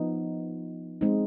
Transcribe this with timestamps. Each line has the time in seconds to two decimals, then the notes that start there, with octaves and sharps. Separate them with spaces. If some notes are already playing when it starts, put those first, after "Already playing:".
Already playing: F3 B3 D#4
1.01 G#3 C4 D#4